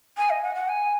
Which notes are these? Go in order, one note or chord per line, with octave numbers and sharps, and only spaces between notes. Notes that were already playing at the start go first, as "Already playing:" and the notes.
G#5
D#5
F#5
F#5
G#5